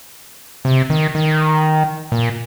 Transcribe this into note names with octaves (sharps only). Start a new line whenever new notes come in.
C3
D#3
D#3
A#2